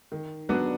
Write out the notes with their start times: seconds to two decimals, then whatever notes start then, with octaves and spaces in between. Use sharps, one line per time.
0.12 D#3
0.49 F#3 B3 D4